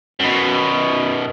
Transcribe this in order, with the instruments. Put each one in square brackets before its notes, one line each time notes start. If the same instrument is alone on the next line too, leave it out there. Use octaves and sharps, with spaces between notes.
[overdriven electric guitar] F#2 B2